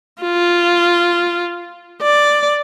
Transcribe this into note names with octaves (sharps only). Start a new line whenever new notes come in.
F4
D5